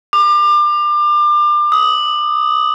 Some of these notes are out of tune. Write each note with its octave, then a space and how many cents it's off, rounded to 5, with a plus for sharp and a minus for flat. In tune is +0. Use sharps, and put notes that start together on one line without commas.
D6 +30
D#6 +20